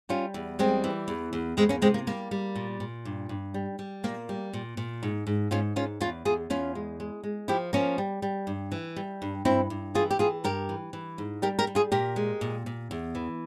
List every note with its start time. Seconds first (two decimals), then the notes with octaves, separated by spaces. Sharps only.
0.09 G3 C#4 F4
0.34 E2
0.59 G3 G#3 C4
0.84 E3
1.08 E2
1.33 E2
1.57 E2 G#3 C4
1.69 A#3 C#4
1.82 C3 G#3 C4
1.94 A#3
2.07 G3 A#3
2.31 G3
2.55 A#2
2.80 A#2
3.05 G2
3.29 G2
3.54 G3
3.79 G3
4.04 A#2 A#3
4.29 G3
4.53 A#2
4.77 A#2
5.03 G#2
5.27 G#2
5.51 G#2 C#4 F4
5.76 G#2 C#4 F4
6.01 E2 C#4 F4
6.25 E2 F4 G#4
6.50 E2 C#4 F4
6.75 G#3
7.00 G#3
7.23 G#3
7.48 F3 E4 G4
7.73 F3 A#3 C#4
7.98 G3
8.22 G3
8.47 G2
8.72 E3
8.96 G3
9.22 G2
9.45 G2 C4 E4
9.70 G2
9.95 E3 F4 G#4
10.10 G4
10.19 E3 F4 G#4
10.44 G2 G4 A#4
10.69 E3
10.93 E3
11.18 G#2
11.42 G3 G4 A#4
11.59 G4 A#4
11.67 G3
11.75 F4 G#4
11.92 A#2 G4 A#4
12.16 G#3
12.41 A#2
12.66 A#2
12.91 E2
13.15 E3